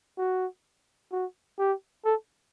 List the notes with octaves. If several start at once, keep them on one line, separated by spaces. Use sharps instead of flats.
F#4
F#4
G4
A4